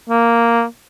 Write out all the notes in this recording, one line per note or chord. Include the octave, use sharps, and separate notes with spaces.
A#3